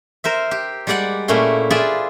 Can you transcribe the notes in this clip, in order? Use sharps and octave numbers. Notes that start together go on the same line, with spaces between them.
A#4 C5 E5
G4
G3 G#3 G4 D5 F#5
A#2 A3 C#4 E4 C6
F4 G#4 B4 D5 E5